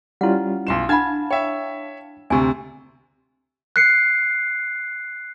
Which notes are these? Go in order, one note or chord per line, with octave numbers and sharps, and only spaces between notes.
G3 C#4 E4 F4 F#5
B1 C6 E7
D4 F5 F#5 A5 B5 G#6
C#5 E5 G5
D2 C3 G#5 A5 C#6
F#6 C7 C#7